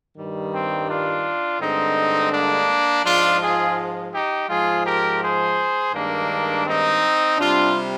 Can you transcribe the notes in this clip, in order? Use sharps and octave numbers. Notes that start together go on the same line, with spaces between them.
G2 D#3 G3
C4
D4 F4
G2 D3 G#3 C4 D#4
A#3 D4
G#2 F3 G#3 D4 F4
F4 G#4
D#4 G4
G#2 F3 G#3 F4 G#4
G4 A#4
G#4 C5
G2 D#3 G#3 A#3 D4
C4 D#4
C3 G3 D4 F4